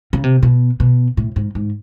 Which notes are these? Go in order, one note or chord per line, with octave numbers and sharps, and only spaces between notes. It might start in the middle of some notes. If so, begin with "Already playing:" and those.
C#3
C3
B2
B2
A2
G#2
G#2